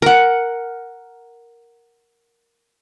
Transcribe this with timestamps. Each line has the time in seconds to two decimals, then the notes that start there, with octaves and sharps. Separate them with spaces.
0.02 A#4 F#5